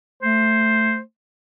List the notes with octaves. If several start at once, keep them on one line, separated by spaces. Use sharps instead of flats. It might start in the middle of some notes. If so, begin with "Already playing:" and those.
A3 C5